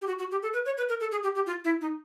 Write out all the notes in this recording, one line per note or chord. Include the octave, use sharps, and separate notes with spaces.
G4
F#4
F#4
G4
A4
B4
C#5
B4
A#4
A4
G#4
G4
G4
F4
E4
D#4